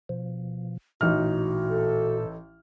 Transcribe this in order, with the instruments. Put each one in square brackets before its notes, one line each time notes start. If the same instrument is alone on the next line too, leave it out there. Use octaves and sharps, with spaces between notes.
[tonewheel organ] B2 F3
[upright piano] A1 D#4 F6 [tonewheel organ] A#2 [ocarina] F#4
[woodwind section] A4